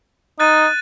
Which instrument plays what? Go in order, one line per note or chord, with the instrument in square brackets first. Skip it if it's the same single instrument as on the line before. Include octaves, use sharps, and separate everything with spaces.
[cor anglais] D#4 [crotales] F#6 A6 D#7